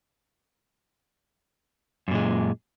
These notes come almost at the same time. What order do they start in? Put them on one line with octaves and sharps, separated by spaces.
F#2 A#2 G#3